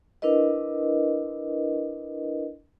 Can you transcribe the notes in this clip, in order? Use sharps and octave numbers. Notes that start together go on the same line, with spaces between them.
D4 E4 A#4 B4 D#5